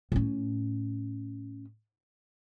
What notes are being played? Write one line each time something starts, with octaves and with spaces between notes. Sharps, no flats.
A2 C#4